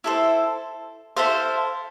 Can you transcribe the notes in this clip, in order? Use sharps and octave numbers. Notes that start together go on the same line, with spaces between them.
E4 A4 C5
E4 A4 C5 F5